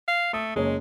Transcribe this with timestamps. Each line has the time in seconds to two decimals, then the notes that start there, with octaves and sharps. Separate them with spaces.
0.08 F5
0.33 A3 D#6
0.56 F#1 G#3 C#5